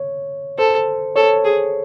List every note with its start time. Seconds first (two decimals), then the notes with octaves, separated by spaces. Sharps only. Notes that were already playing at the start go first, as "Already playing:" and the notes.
Already playing: C#5
0.58 A4 C5
1.16 A4 C#5
1.45 G#4